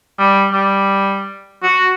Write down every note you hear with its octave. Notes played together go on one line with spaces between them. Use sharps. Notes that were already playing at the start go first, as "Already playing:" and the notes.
G3
G3
F#4